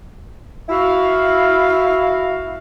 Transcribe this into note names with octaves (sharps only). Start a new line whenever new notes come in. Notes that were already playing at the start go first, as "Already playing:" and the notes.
E4 F#4 F5